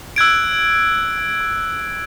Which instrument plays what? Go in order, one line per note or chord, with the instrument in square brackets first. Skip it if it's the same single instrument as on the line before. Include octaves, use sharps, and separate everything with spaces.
[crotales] E6 F#6 G#6 D7